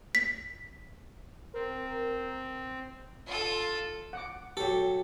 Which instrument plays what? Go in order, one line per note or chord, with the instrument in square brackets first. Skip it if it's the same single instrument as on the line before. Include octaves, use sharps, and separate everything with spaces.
[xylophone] B6
[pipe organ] C4 [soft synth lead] A#4
[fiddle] F4 A4
[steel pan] F#5 D6
[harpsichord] F#3 A4 [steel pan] G4